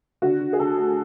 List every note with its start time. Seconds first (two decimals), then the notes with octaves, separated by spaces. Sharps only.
0.22 D3 F#4
0.40 D3
0.53 G#4
0.59 D2 A4
0.77 A3